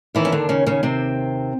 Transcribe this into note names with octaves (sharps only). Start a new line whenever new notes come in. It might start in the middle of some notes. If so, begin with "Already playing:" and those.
D#2 D#3 E3 E4
C#4
D3 D4
C#3 C#4
C#3 C#4
C3 C4